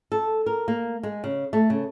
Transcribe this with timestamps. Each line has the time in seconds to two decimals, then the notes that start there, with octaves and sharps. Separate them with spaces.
0.12 A4
0.46 A#4
0.68 A#3
1.03 G#3
1.24 C#3
1.53 A3
1.70 C#3